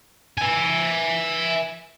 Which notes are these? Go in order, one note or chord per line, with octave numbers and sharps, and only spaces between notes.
E5 G#5